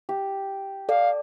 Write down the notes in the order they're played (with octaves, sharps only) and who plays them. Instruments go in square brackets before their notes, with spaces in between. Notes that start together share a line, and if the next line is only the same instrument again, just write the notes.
[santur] G4
[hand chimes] A4 D5 [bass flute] F5